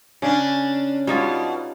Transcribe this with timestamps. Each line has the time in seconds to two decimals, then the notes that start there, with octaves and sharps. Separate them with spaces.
0.22 C#3 C#4 D4
1.07 B2 G3 D#4 F4